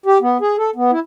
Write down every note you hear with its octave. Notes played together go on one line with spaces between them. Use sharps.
G4
B3
G#4
A4
B3
E4